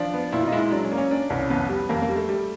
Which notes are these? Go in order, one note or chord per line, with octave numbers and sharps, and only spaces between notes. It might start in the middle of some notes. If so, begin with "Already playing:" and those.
Already playing: F3 D4
B3
A#2 E4
F4
D#4
G#3 E4
E4
F#3 D4
C#4
A#3
C#4
A#3 D4
C2 C#4
F2 B3
G3
F2 A#3
A#3
G3
A3
G3